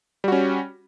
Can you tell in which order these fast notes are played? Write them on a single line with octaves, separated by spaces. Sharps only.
G3 F#4 C#4